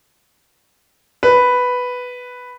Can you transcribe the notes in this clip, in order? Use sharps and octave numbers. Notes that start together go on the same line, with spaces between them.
B4